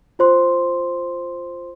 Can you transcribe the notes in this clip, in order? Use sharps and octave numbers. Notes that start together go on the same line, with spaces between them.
F4 C5 C6